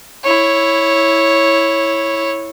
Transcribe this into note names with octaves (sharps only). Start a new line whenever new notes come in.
E4 C#5